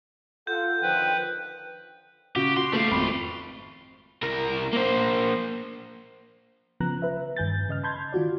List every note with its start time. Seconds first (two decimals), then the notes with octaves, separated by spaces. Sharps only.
0.47 F4 A4 F#5 G6
0.82 D3 D#3 F3 B4 G5
2.36 C#3 F#4 G4
2.57 F#4 C6
2.72 G3 A3 F5 D6
2.91 G#1 F2 E4 B5 C6
4.22 C2 A#4
4.73 A#3 C5
6.80 C#3 F3 B3 A#5 F#6
7.02 B4 E5
7.37 G2 D#3 G#5 G6 A6
7.69 C#3 D#5 F6
7.83 A5 B5 C6 G6 G#6
8.13 D#3 F4 F#4 D5